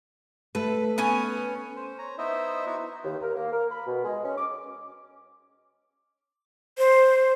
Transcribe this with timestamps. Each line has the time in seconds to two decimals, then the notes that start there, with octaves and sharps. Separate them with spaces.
0.55 A3 A4 B4
0.98 B3 C#4 G#5
1.76 C5
1.99 C#5 A#5
2.18 B3 D#4 E4 C5 D#5 E5
2.66 B3 D#4 E4 F#4
3.04 D#2
3.22 A#4
3.35 A#3
3.53 A#4
3.71 B5
3.87 B2
4.05 G#3
4.24 C#4
4.38 D6
6.78 C5